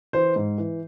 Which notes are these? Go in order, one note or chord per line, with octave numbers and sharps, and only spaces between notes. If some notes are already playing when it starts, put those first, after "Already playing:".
E3 C5
G#2
E3